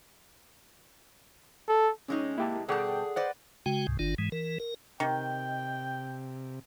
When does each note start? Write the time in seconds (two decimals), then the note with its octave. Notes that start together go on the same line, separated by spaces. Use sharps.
1.68 A4
2.08 C3 G#3 C#4 D#4
2.38 A#3 E4 G4 A5
2.69 B2 G3 G#4 A4 D5 F#5 G5 A5
3.16 B4 C5 D5 D#5 F#5
3.66 C#3 G#3 F#4 G5
3.87 C#2 G#2 C3
3.99 G1 D#3 D4 F4
4.18 G#2 E3 G#3
4.32 E3 A#4
4.60 A#4
5.00 C3 D#3 G5